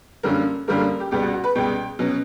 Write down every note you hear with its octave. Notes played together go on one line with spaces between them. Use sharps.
F#2 D3 G3 A#3 C#4 A#4
F#2 D3 G3 A#3 C#4 A#4
A#4
G4
C#2 B2 G3 G4
F#4
F#4
B4
C#2 B2 G3 G5
B2 F#3 C#4